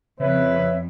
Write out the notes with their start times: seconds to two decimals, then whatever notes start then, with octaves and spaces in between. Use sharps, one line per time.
0.20 F2 C#3 B4 C#5 E5